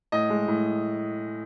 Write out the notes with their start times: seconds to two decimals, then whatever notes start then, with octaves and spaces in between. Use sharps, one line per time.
0.12 A2 D#5
0.30 G#3
0.48 A2